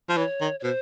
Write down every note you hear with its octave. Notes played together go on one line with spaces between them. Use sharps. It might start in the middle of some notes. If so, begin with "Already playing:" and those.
F3
E3 C#5
D#3
C#5
B2 C5